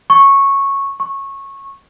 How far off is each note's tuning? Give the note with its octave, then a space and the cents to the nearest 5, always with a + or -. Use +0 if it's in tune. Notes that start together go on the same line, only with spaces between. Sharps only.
C#6 -10
C#6 -15